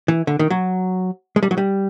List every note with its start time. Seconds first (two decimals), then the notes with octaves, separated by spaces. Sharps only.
0.08 E3
0.27 D3
0.39 D#3
0.50 F#3
1.36 G#3
1.43 G3
1.51 F#3
1.58 G3